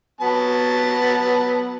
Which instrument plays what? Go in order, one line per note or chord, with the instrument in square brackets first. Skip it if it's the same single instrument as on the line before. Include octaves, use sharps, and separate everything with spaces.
[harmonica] F#3 B3 A5